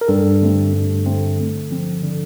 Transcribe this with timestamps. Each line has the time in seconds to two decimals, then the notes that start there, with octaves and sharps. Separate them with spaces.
0.01 A#4
0.08 G2 A4
0.41 D3 A3 C4
0.73 G2
1.06 D3 A3 C4
1.38 D3
1.71 F3 C4
2.03 D3